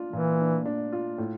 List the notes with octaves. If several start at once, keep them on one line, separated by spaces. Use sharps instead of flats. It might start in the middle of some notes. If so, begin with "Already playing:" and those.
Already playing: D4 F4
A#2 E3
D4
D4
F4
A2